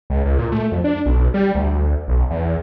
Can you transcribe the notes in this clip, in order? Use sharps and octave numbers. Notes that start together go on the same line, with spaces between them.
C#2
C#2
A#2
A3
F2
D4
B1
G3
D2
B1
E2